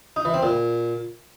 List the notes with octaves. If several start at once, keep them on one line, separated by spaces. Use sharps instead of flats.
D#4
E3
C4
A#2